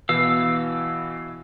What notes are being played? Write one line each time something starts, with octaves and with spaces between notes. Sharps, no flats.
B2 E3 E4 F5 E6